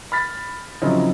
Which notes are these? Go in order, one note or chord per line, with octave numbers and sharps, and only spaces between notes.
B5 F6 A6 B6
C#3 F3 F#3 C4 D#4 E4